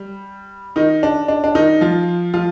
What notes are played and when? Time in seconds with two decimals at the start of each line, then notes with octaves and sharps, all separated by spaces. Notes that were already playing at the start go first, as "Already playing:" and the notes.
Already playing: G3
0.76 D#3 D#4
1.03 D4
1.28 D4
1.44 D4
1.55 D#3 D#4
1.81 F3 F4
2.34 F3 F4